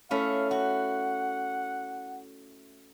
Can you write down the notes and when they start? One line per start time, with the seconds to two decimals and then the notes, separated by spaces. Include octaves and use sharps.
0.11 A3 C#4 E4 F5
0.51 F#4 F#5